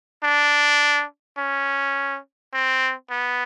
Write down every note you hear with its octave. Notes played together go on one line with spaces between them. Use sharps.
D4
C#4
C4
B3